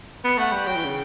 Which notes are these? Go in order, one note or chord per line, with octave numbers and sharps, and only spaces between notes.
B3
A3 F#5
G3
F#3 G5
E3
C#3